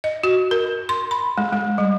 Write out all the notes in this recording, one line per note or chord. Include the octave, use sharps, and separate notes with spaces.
D#5
F#4
A#4
C6
B5
G#3
G#3
G3